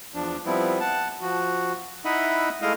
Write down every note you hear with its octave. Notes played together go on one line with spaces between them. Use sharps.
E2 F3 D4
F3 G3 B3 C4 E4
F#5 A5
F3 F#4
D#4 E4 D#5 E5 F#5 B5
G#3 A3 E4 D#5 F5